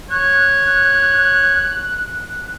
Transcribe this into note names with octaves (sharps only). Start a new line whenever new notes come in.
C#5 F#6